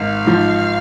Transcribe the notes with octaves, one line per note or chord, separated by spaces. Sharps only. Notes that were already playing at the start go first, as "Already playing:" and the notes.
Already playing: G#1 G#2 F5
G#2 F3